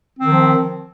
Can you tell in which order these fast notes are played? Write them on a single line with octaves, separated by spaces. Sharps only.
C4 D#3 F3